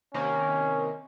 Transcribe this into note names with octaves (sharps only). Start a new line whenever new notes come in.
C3 D#3 A#3 C#4